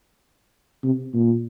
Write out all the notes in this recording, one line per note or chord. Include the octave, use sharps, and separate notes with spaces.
C3
A#2